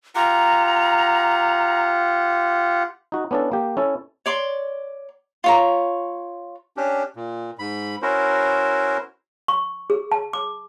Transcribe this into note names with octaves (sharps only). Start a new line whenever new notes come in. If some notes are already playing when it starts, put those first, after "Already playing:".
F4 G4 F#5 A#5
D#4 F#4
B3 C#4 D4 E4 A4
A#3 G4
C#4 E4 A4
C#5 D5 C6
F4 C#5 A#5
C#4 D4 G4
A#2
G#2 B5
C#4 E4 F#4 A#4 C5
C#6
G#4
A5
D6